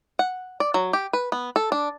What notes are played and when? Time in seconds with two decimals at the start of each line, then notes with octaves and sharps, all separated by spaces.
0.19 F#5
0.60 D5
0.74 F#3
0.93 G4
1.13 B4
1.32 B3
1.56 A4
1.72 D4